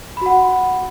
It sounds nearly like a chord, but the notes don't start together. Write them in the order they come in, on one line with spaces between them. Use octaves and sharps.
B5 F#4 F#5